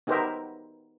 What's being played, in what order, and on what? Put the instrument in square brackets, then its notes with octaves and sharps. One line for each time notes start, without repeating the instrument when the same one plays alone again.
[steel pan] B3 D#4 G4 A#4 C5 E5